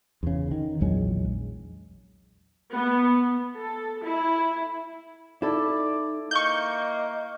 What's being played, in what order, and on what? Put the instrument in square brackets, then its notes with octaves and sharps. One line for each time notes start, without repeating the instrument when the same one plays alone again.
[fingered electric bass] E2 C#3
D#3
A#1 E2 F#3 G#3
[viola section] B3
A4
E4
[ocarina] D#4 [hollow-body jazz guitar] E4 A4 [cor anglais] D5
[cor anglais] A#3 [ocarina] D#5 [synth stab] C#6 G6